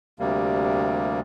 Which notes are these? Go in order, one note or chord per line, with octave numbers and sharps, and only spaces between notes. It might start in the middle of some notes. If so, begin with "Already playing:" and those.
D2 C3 G3 A#3